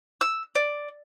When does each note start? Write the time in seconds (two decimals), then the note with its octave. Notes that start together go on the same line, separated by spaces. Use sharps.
0.21 E6
0.55 D5